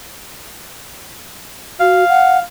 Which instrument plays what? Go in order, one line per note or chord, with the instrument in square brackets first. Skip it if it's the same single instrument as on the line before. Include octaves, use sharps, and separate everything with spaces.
[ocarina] F#4 [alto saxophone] F5
[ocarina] F#5